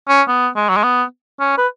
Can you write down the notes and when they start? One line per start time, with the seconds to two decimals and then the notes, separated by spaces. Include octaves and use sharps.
0.09 C#4
0.28 B3
0.56 G#3
0.69 F#3
0.77 G#3
0.83 B3
1.40 C#4
1.58 B4